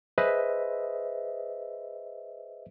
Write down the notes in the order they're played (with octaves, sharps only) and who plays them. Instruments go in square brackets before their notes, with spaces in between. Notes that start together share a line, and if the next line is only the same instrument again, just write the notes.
[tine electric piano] G#4 B4 C5 D#5 E5